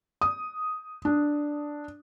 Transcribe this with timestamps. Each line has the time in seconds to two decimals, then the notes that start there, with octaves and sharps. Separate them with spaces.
0.21 D#6
1.05 D4